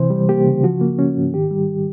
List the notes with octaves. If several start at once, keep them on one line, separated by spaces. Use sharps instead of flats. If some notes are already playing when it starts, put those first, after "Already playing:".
Already playing: C3 E3 C5
G3
A#3 G4
C#3
F3 F#4
A#3
C#4
G#2
D#3 G4
G3